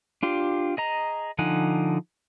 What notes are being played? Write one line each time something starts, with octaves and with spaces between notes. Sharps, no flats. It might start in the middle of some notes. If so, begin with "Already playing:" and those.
D4 F4 G4
G#4 D#5 A#5
D3 F3 D#4 F#5 G#5